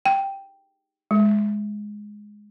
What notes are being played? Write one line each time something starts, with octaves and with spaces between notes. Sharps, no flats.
G5
G#3